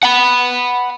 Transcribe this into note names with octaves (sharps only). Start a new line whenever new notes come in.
F#5 B5